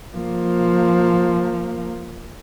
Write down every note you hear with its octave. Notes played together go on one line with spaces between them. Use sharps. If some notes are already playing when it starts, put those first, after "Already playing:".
F3 A#3